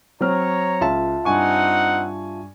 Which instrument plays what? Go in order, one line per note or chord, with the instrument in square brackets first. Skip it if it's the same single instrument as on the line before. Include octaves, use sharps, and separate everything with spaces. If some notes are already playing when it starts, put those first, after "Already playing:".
[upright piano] F#3 C4 F6 [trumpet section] C#5 A#5
[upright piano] C#2 [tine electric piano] F4 E5 A5
[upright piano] G2 G#5 C#6 [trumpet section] C4 D#4 F#5